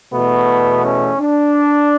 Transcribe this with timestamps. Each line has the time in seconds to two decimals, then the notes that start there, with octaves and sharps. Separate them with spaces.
0.13 E2 B2 A3 B3
0.84 C#4
1.19 D4